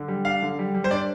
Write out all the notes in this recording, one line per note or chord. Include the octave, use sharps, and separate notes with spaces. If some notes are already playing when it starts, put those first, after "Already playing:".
Already playing: D3
G3
D4 F5
D3
G3
G3
C5
D4 D5